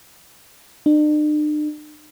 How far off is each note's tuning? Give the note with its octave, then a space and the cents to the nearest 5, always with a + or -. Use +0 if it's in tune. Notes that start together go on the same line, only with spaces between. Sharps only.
D4 +45